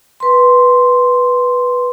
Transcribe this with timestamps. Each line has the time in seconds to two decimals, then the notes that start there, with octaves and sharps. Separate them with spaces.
0.20 B4 C6